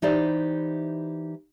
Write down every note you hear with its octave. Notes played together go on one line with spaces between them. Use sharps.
E3 D#4 E4 G4 C5 D5